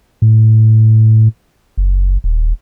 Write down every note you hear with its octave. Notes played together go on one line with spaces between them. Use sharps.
A2
F#1
D#1